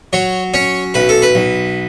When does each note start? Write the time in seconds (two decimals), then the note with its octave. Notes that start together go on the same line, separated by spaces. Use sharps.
0.13 F#3 C#5
0.54 C#4 C#5
0.94 B1 B4
1.09 A4
1.22 B4
1.35 B1